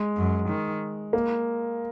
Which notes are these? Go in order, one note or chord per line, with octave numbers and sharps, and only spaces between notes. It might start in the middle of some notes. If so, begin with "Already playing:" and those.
Already playing: G#3
F#2
D#3
A#3